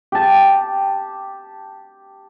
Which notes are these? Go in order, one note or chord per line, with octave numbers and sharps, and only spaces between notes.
G4 A5